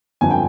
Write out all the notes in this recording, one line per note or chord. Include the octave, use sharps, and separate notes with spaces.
G1 F2 D3 G#5
G5